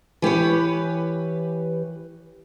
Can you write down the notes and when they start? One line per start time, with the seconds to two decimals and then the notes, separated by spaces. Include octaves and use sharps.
0.22 E3 G4 B4 C#5